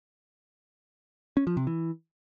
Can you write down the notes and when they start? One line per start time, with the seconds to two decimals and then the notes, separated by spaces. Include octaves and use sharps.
1.37 C#4
1.47 F3
1.57 C3
1.67 E3